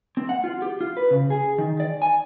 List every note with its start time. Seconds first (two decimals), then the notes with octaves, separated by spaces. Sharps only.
0.17 C4
0.29 F#5
0.44 F4
0.62 G4
0.81 F4
0.97 B4
1.11 C#3
1.30 G#4
1.58 D#3
1.80 D5
2.02 G#5